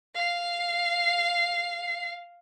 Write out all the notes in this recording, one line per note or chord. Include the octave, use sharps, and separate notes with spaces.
F5 C7